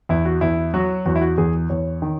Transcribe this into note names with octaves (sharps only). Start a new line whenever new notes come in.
E2 E4
F#4
E2 E4
F#3 F#4
E2 F#4
E4
F#4
E2 G#4
E2 C#5
D#3